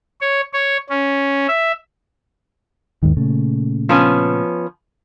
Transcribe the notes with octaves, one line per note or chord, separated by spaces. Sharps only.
C#5
C#5
C#4
E5
D#2 G#2 D#3
A#2 C#3 A3
F3 B3 C#4